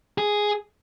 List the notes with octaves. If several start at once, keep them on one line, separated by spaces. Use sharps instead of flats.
G#4